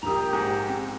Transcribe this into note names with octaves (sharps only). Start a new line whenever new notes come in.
A#1 G4 A#4 A#5 D#6
G#2
C4